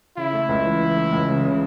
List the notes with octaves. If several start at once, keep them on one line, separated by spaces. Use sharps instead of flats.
C#3 E4
A3
C#2
E3
E3
A3
C#2
C#3
C#3